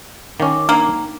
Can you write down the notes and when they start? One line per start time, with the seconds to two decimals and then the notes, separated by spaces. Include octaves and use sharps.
0.40 D#3 C#4 F5 D6
0.69 A#3 D4 D#4